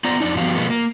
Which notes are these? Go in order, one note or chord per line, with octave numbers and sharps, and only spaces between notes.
B3 F4 C5 D5 A#5
F2 D4 D#4
G2 F3 B3 F#4 G4 F5
B2 F3 G#3 A#3 B3
A#3